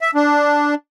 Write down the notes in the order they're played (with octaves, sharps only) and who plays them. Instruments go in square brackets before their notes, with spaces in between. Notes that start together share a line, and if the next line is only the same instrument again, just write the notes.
[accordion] E5
D4